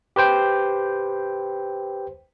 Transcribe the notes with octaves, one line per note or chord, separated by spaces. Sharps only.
G4 B4 C5 G5